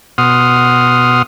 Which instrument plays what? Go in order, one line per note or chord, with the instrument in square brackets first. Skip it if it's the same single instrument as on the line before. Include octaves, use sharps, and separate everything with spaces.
[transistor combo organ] B2 F#5 C6 D#6 F6